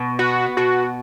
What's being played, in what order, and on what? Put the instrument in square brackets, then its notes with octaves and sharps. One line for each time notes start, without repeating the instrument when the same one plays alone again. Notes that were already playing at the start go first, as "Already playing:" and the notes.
Already playing: [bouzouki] B2
[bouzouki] B3 [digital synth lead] F#4
[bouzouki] B2 [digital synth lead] F#4